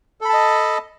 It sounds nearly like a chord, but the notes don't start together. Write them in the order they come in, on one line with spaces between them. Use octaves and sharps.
A4 B5 A5 D#5